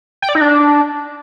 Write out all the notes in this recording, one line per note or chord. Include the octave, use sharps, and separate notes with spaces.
G5
D5
D#4
D4